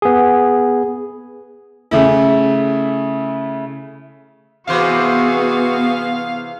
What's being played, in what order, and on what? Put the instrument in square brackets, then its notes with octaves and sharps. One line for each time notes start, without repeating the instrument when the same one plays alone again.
[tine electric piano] B3 G#4
[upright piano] C#3 A3 E4
[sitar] C3 E3 C5 [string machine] B3 [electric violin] F#4 G#4 [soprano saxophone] F5